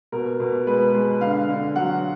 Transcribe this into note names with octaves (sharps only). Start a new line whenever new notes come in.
B2 A#4
B2
G#3 B4
G#3
D3 F5
D3
F#3 F#5